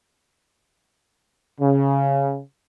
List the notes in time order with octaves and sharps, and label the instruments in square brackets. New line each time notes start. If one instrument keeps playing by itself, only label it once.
[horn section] C#3